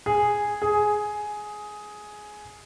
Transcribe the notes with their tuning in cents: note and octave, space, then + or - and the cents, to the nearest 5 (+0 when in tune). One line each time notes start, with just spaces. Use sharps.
G#4 -5
G#4 +10